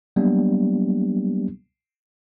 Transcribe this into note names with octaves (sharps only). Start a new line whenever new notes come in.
F#3 G3 A#3 B3 D4 G4